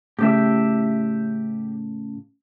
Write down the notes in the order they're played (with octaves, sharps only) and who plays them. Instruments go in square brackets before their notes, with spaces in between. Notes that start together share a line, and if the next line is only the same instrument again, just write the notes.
[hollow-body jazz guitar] A2 C#3 [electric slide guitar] G4 E5